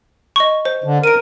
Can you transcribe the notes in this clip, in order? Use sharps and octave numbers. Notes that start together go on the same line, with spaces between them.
D#5 C#6
C5
D3
A#4 D7 D#7